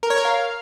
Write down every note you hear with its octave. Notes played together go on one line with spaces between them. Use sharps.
A#4
C#5
A#4
F5